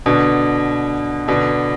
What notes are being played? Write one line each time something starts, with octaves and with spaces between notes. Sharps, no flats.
B2 D3
B2 D3